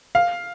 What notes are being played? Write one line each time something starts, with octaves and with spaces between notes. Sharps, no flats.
F5